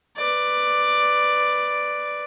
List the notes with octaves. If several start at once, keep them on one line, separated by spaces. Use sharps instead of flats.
B4 D5